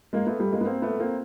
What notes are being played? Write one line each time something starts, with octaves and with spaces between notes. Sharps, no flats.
G#3 A#3
A3 B3
G3 A3
G#3 A#3
B3
A#3 C4
A3 B3
A#3 C4